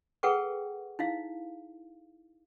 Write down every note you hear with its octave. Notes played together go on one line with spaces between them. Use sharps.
G#4 A4 B4 F#5 G5 C#6
D#4 E4 F5